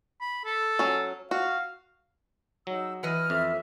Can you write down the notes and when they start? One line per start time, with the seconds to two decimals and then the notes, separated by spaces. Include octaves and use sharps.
0.21 B5
0.45 A4
0.79 F#3 C#4
1.31 F#4 F5
2.67 F#3 D#4 G#4 E6
3.03 E3 E4 B4 D#5 F6
3.30 F2 E5